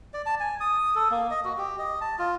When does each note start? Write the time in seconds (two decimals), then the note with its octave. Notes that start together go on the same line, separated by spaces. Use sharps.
0.14 D5
0.26 A5
0.40 G#5
0.60 D#6
0.95 A4
1.11 A#3
1.30 D#5
1.45 F#4
1.58 G4
1.79 D#5
2.01 A5
2.19 F4